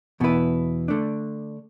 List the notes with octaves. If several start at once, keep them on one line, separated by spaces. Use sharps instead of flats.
E2 B2 B3 E4 B4
D3 A3 D4